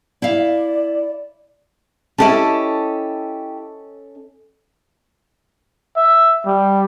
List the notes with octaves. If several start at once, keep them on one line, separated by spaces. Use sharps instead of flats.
E4 D5 E5 F5
C#4 E4 G4 A4 D#5 A5
E5
G3